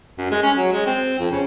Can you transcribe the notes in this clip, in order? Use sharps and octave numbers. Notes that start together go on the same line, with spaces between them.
F#2
G#3
C#4
F#3
G#3
C4
F2
C#3